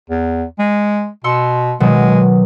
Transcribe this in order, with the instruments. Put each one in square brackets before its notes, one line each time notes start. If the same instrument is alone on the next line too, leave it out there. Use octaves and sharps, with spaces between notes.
[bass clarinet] E2
G#3
[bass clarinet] B2 [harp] C6 E6 C#7
[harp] B2 D#3 F#3 [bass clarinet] G#3